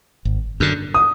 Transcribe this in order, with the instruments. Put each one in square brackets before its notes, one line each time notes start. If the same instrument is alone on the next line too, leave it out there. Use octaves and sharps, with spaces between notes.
[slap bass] G#1
F#2 D3
[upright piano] D#6